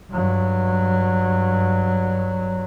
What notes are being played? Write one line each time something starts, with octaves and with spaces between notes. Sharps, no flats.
G2 F#3